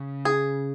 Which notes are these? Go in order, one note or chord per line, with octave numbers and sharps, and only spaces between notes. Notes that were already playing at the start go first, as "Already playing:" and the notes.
Already playing: C#3
G#4